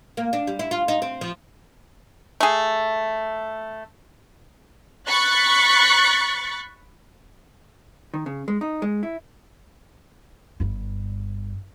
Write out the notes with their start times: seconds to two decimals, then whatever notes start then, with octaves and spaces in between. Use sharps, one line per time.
0.17 A#3
0.33 D4
0.47 G3
0.59 E4
0.71 F4
0.88 D#4
1.02 C4
1.21 F3
2.40 A3 G#4
5.07 B5 C#6 F#6 A6 C#7
8.14 D#3
8.26 C#3
8.48 G#3
8.61 D#4
8.82 G#3
9.03 E4
10.60 G1 G2